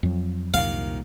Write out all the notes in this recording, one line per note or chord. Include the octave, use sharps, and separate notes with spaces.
F2 F#3
C2 A#2 D#3 F5